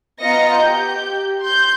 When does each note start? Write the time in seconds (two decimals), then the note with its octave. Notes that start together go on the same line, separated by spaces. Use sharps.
0.21 B3 F4 D#5 A#5 A#6 C#7
0.58 G4 G6
1.41 C6 G6